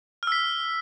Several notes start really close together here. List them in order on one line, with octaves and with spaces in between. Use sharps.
F6 E6 B6